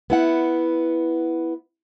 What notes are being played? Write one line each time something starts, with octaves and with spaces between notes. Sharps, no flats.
B3 E4 F#5